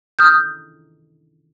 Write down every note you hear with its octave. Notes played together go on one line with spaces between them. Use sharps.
D#6 F6 G6